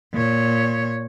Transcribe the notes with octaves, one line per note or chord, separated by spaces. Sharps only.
A#2 C#5